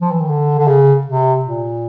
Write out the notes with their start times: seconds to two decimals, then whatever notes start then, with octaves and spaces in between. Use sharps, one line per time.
0.02 F3
0.12 E3
0.21 D#3
0.29 D3
0.59 D3
0.68 C#3
1.07 C3
1.45 A#2